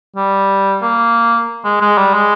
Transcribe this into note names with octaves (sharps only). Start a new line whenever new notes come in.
G3
A#3
G#3
G#3
G3
G#3